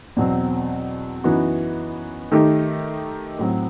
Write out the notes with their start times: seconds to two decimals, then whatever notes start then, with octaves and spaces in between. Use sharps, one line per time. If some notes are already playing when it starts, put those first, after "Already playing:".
0.16 E2 B2 F#3 C4
1.24 F#2 E3 B3 D#4 F#4
2.32 D#3 A3 D#4 G4
3.39 A2 F#3 C4